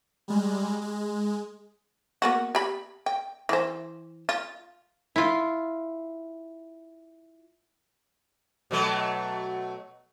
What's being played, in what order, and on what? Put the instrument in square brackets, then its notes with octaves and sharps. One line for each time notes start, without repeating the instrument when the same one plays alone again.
[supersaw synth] G3 G#3
G#3
[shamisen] A#3 B3 F#4
G4 B5
G5
E3 C5
F4
[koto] E4 F4
[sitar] B2 F#3 A3